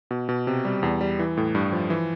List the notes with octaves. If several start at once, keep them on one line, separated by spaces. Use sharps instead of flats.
B2
B2
C3
G3
E2
G3
E3
A2
G2
F3
E3